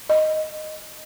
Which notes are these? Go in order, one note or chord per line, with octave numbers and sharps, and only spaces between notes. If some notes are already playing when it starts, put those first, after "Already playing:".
D#5